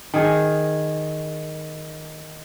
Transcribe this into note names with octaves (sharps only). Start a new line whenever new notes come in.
D#3 G#4